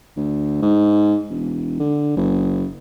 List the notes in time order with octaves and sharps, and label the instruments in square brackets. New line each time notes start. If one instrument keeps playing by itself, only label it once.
[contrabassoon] D2
G#2
E1
D3
F#1